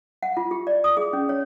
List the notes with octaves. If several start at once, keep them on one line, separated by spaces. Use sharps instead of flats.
F#5
F4
G4
D5
D#6
G#4
C#4
C#5